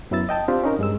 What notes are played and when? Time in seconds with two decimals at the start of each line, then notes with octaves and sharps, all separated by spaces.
0.11 F#2 F#3 B3 E4 E6 A6
0.29 D#5 G5 A5
0.48 C4 D4 F4 G4
0.64 C#4 D#4 A#4
0.79 G2 G#3 E6